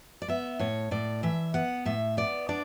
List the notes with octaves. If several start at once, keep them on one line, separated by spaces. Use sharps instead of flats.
D5
B3 E5
A2 C#5
A2 D5
E3 E5
B3 F#5
A2 E5
B3 D5
D4 D5